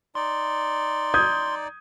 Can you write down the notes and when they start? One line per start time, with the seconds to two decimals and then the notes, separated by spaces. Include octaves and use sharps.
0.15 D#4 D5 C6
1.14 D#6 G6 G#6